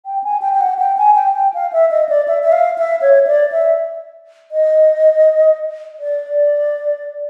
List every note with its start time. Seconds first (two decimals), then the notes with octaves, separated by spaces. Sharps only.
0.05 G5
0.24 G#5
0.42 G5
0.54 G5
0.61 F#5
0.79 G5
0.98 G#5
1.16 G5
1.35 G5
1.54 F5
1.73 E5
1.91 D#5
2.09 D5
2.28 E5
2.43 E5
2.52 F5
2.78 E5
3.02 C#5
3.27 D5
3.52 E5
4.52 D#5
6.00 D5